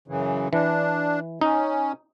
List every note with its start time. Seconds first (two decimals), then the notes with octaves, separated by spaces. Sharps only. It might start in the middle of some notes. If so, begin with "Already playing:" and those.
0.08 F#2 C#3 E3
0.53 E3 D4
1.41 C#4 D#4